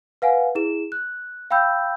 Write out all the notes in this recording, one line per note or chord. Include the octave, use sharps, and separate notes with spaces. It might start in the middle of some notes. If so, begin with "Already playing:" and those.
B4 F5 F#5 G#5
E4 G#4 E7
F#6
F5 G5 B5 E6 G6